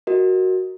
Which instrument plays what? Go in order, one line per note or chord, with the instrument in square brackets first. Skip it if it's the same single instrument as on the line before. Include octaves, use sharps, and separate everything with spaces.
[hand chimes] F#4 A#4 D#5